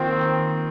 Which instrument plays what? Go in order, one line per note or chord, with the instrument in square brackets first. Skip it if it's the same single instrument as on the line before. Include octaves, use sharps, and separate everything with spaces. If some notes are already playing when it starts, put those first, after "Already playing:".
Already playing: [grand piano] D#3 A#3 F4 [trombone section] C4